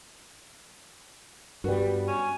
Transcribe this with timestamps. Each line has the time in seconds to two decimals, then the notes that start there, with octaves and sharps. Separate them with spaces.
1.64 G2 G3 B3 F#4
2.08 C#4